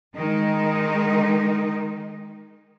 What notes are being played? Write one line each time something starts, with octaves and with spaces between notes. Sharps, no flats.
D#3 G#3 D#4